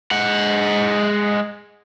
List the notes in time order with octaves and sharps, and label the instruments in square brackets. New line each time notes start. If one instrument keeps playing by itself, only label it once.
[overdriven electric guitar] G#3 F#5